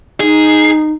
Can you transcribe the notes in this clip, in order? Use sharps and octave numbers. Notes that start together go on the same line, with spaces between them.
D#4 G#4